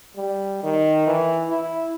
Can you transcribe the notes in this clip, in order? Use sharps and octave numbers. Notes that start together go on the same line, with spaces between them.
G3
D#3
E3
E4